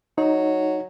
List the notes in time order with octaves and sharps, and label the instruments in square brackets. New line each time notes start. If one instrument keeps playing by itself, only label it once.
[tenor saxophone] F#3 [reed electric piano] D#4